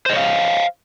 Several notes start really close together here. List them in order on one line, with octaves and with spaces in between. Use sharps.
C5 D#5 C#5 F5